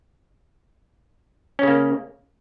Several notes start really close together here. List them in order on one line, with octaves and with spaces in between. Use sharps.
C#4 C#3 A#3